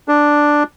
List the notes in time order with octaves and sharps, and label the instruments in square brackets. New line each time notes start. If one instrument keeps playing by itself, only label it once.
[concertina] D4